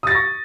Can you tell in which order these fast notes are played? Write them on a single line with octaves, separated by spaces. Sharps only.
D#6 A6 A#6 C#6